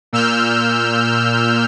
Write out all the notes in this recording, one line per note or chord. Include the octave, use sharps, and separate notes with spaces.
A#2 E6 F6 G6